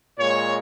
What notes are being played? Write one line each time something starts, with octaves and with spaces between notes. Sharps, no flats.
A#2 G#3 C#5